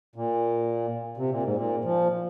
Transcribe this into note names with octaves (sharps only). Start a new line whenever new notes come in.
A#2
C3
A#2
G#2
A#2
F3